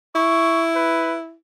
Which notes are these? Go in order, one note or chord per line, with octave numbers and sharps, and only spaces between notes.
E4 C#6
B4